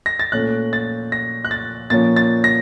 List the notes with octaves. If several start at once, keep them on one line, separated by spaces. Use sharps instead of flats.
A#6
A6
A#2 A3 C#4 F#6
A6
A#6
F#6
A6
A#2 F3 A#3 C#4 A6
A6
A#6